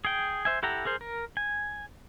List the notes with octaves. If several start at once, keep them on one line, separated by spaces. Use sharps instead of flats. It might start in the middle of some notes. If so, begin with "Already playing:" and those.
G#4 G5
C5 E5 G#5
E4 G4 A4 F#5 A#5
G#4 A#4 C5
A#4
G#5